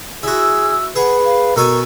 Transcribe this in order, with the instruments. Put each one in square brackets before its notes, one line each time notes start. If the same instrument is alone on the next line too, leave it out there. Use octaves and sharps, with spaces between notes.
[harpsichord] E4 F#4 [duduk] G#4 [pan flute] E6
[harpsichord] G#4 [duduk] B4 [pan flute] F#5
[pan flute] F5
[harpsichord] B2 A4 G#5 [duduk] A#4 [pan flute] C#6